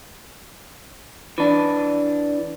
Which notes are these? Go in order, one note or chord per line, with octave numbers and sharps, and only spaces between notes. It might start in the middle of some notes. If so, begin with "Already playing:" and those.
E3 D4